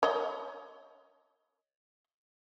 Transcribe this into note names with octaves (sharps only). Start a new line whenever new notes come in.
C#5 D#5